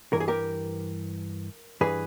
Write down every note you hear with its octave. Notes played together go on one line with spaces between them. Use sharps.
G2 E3 A#4
G#4
G4 A#4
G2 E3 G#4 B4